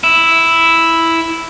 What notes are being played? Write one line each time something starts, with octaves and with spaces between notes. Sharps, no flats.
E4